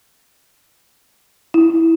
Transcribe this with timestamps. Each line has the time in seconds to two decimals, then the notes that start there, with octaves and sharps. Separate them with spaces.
1.54 E4